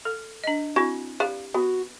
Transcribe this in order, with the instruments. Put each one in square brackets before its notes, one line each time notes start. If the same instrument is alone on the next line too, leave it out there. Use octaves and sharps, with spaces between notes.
[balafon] A4
D4 D#5
[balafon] C4 E4 [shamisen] F#4
[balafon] G4 [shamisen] B4 D5 F5
[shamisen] B3 [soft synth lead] F#4